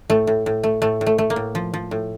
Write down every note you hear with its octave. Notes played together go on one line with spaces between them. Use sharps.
A2 A3
A2
A2
A3
A2 A3
A2
A3
A3
A#3
A2
F3
F3
A2